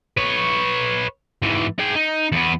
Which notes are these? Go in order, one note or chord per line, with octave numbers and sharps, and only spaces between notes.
B4 C#5
G#2 E3
G#4 G5
D#4
E2 B3